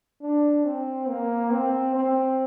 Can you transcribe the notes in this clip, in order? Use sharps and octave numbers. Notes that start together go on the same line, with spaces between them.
D4
C4
A#3
C4
C4